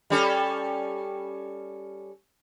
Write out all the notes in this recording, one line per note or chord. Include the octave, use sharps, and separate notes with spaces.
G3 C#4 A4